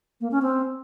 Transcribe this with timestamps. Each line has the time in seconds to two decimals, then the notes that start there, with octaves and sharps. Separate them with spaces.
0.21 A#3
0.31 C#4
0.42 C4